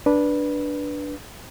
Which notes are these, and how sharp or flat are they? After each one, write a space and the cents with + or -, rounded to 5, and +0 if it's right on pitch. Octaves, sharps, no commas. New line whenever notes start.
D4 +0 B4 -15